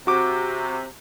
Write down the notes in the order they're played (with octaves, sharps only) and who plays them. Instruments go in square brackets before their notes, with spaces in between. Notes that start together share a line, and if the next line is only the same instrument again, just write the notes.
[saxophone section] C3 [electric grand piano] F#4 D6